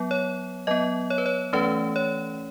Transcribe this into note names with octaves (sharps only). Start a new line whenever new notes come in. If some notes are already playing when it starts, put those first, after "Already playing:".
Already playing: F#3 B3
C#5
F#3 B3 D#5
C#5
B4
C#5
E3 A3 C#4 B4
C#5